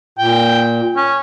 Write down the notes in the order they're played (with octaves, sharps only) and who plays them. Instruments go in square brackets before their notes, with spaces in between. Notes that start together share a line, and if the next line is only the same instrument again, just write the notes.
[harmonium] A#2 [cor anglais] G5
[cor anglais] C#4